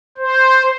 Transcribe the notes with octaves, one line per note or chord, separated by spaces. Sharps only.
C5